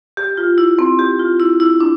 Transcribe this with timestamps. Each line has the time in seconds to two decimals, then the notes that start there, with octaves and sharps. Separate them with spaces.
0.17 G4
0.37 F4
0.58 E4
0.79 C4
0.99 G4
1.19 F4
1.40 E4
1.60 E4
1.80 D4